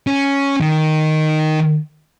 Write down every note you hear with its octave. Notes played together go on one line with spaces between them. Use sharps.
C#4
D#3